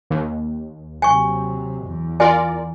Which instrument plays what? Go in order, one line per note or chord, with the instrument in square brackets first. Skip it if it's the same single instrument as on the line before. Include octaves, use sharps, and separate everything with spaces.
[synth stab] D#2
[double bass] C3 F#3 [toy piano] G#5 C#6
[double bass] E2
[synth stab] F4 A#4 D5 [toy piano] G#5